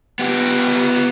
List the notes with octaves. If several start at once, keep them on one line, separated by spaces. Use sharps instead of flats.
B3 G4